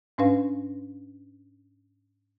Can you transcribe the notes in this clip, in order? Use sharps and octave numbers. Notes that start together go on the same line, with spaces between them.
G#2 C#4 D4 B4 F5